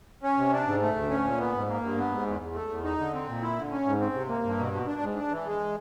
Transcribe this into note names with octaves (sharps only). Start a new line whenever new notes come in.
C#4
C3
D4
G#2
A3
D2
C#4
A#2
B3
G#2
A#3
G2
B3
G#2
E2
E2
A3
E2
D#4
D3
C4
A#2
E4
D3
C#4
G#2
C4
C3
A#3
G2
B2
B2
D4
G#2
D4
E3
G#3